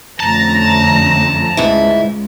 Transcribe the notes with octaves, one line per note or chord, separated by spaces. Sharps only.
F2 D3 A3 C#4 A5 A#5
C#2 G#2 E4